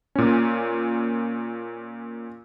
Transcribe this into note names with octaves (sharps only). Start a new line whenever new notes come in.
A#2 C#4